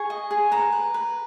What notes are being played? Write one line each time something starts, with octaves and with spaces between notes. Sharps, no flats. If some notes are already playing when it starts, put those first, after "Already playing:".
Already playing: G#4 C#6
D#5
G#4
B4 A#5
B4
B4